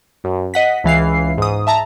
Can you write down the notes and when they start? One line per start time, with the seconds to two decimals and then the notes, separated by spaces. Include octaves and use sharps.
0.24 F#2
0.54 D#5 F#5 B6
0.84 C#2 E3 F5 C7
1.38 G#2 D#6
1.67 E5 A5 A#5